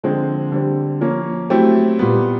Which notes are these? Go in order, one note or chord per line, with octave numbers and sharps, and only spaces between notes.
D3 F3 G#3 C4
D3 G3 C4
F3 A#3 C#4
F#3 A3 C4 E4 G4
A#2 G3 B3